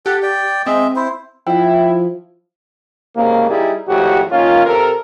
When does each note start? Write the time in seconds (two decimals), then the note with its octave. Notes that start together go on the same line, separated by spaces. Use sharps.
0.06 G4 A4 F#5
0.22 D5 G5
0.66 G#3 C4 D#5 E5
0.96 E4 C5
1.47 F3 E4 E5 G5
3.16 C2 G#2 C#3 A#3
3.50 G3 D#4 E4 G#4
3.89 G#1 F2 A2 F#4 G4
4.31 D#3 A#3 C#4 F4
4.67 C3 A4 A#4